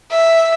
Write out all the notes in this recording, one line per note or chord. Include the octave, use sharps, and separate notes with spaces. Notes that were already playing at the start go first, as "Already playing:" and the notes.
E5